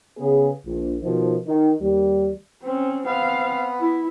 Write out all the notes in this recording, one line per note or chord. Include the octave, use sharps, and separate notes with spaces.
C#3 B3 G#4
A#1
B2 D#3 F3
D#3
D#2 G3
C4 C#4
B3 C4 F5
E4